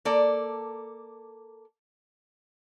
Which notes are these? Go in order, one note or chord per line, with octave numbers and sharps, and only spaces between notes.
A#3 A4 D5